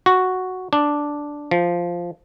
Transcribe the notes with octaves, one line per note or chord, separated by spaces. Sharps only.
F#4
D4
F3